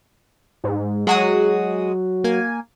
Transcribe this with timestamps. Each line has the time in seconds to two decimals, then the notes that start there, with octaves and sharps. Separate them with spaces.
0.64 G#2
1.07 F#3 G#3 F#4 D#6
2.24 A#3 G#5